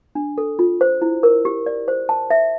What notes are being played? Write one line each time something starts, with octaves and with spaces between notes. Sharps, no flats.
D4
A4
F4
C5
E4
A#4
G4
D5
C5
A5
E5